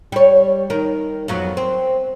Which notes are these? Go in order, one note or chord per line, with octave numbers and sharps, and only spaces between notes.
G3 C#5
D#3 A#4
F2 F#3 B3
C4